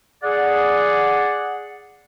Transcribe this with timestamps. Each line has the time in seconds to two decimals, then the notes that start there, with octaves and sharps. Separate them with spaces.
0.23 G#4 D5 F#5